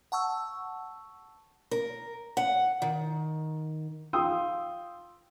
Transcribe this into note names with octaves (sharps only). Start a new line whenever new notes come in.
F#5 A5 C#6 E6
A#4
F#5
D#3
F4 G5 C6 D#6 E6